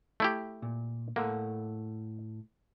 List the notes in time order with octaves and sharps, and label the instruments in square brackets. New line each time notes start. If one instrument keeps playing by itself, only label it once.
[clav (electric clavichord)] A3 E4 G4
[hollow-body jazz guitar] A#2
[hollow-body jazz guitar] A2 A4 F#5 [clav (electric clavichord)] A#3